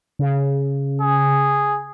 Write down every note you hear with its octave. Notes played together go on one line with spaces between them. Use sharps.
C#3
G#4